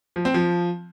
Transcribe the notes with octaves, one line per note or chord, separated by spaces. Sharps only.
F3
C4
F3